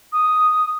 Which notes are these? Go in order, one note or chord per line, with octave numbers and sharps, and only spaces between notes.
D#6